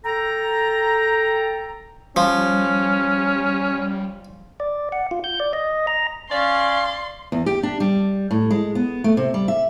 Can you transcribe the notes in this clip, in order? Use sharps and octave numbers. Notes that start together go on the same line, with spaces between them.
A4 G5 A#5
F3 G3 C#4
D5
F#5
F4
G6
D5
D#5
A#5
C#4 D5 F5 C6
E2
G4
D4
G3
A2
G#3
B3
A3
C3
G3
E5